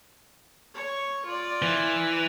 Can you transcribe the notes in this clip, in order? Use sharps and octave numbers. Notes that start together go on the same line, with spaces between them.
C#5 C#6
F4 D5
E3